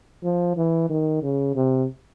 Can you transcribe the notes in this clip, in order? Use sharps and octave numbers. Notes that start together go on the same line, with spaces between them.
F3
E3
D#3
C#3
C3